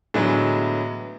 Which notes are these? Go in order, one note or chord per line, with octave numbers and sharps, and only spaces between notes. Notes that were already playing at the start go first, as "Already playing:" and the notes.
A2 D3 E3 F#3 G#3 B3